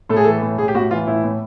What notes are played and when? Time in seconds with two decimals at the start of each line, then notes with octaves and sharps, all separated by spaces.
0.09 A2 A4
0.16 G#4
0.24 E3 A4
0.42 A2
0.58 A2 G#4
0.68 G4
0.75 A2 F#4
0.91 E3 F4
1.07 A2 E4
1.24 A2